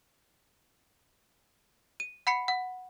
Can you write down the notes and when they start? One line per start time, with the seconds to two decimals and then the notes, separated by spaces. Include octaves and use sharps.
2.00 D#7
2.27 F#5 B5 C7 C#7
2.48 F#5